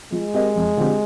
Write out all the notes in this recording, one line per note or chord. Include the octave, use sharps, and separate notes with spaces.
F3 G#3
C4 G4 A#4 D#5
F2
D3 F3 C4 G4